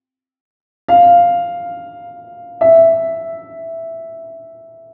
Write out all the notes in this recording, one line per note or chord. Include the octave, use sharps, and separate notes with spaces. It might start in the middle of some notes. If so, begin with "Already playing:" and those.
F5
E5